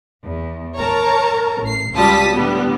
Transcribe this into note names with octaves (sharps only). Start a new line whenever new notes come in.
E2
A#4 C#5 A5 A#5
A1 C7
C#2 G3 F4 A5 D#6 B6
A2 D3 G3 B3